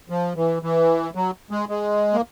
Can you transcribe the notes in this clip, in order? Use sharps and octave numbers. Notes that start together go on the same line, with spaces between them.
F3
E3
E3
F#3
G#3
G#3
A#3